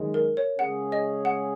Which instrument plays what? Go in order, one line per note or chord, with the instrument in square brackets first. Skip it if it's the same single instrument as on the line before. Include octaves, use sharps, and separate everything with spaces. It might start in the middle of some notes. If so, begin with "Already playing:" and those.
Already playing: [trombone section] F#2 D#3 G#3
[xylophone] A#4
C#5
[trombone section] C#3 G#3 C#4 G#4 [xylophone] F#5
[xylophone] D#5
F#5